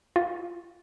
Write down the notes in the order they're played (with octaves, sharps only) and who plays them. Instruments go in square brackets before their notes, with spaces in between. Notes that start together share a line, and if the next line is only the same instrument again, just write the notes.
[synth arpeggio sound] F4